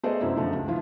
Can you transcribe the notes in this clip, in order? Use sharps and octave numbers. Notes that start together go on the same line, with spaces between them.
A3 B3 G#4 C5 D5 D#5
F#2 C3 C4 E4
F#2 D3 F3 A3 D#4
C#2
D3 E3 F3 E4 F4